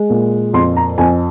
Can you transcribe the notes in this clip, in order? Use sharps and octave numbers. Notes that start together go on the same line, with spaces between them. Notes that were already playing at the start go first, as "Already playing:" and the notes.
Already playing: G#3
A#2
F2 C6
A#5
F2 G#5